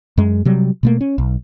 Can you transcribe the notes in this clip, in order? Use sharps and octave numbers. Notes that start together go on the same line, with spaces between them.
F#2 G#3
C3 F#3 G3
B2 A3 A#3
C#4
B1